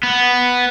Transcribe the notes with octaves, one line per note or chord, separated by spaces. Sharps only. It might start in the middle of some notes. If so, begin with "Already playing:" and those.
B3